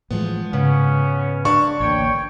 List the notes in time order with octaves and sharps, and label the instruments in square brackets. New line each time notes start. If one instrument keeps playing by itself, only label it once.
[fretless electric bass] A2 E3 G#3 [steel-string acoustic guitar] F3 B3
[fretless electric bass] G#2 [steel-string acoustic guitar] C#3 [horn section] B3 C#4
[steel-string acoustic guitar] D4 [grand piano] C#6
[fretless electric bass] A1 D2 A#3 [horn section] C#5 G5